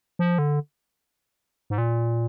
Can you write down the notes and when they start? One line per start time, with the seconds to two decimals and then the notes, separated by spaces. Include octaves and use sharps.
0.19 F3
0.38 D3
1.70 G#2
1.78 A#2